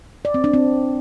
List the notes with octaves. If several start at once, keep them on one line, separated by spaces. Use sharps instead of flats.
D5
C4
D4
C4